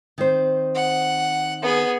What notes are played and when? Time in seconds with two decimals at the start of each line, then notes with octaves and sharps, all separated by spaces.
0.18 D#3 C4 C5
0.75 F#5
1.63 B3 G#4